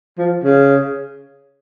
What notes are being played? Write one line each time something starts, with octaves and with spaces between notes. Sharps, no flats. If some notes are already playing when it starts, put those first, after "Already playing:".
F3
C#3